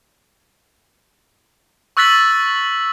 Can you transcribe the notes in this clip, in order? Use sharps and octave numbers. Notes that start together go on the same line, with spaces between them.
C#6 E6 F#6 A6 B6 F#7